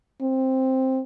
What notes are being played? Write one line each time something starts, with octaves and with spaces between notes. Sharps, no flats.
C4